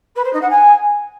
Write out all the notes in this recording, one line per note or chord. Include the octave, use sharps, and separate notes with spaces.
B4
C5
D#4
F#5
G#5